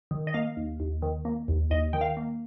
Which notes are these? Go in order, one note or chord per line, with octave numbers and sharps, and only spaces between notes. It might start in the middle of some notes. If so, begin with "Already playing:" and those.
D#3
D#5
A#3 F5
D#2
D#2
D#3
A#3
D#2
D#2 D#5
D#3 G5
F5
A#3